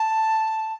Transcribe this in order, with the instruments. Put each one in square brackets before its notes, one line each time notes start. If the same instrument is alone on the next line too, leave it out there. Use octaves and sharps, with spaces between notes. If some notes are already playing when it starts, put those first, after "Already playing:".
Already playing: [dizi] A5